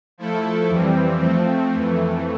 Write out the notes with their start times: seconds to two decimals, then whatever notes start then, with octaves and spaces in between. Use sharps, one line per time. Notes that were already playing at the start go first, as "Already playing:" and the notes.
0.18 F3 A3 E4 A4
0.69 F2 E3 G3 C4
1.20 F3 A3 C4
1.71 F2 E3 A3